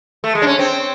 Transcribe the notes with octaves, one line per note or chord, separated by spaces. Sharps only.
A3
G#3
D4
C#4
C4